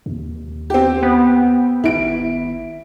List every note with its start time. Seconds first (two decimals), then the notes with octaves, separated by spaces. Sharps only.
0.06 D#2
0.70 C4 G4
1.03 B3
1.84 G#1 E4 D7